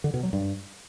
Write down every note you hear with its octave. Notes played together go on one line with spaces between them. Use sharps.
D3
B2
F#3
G2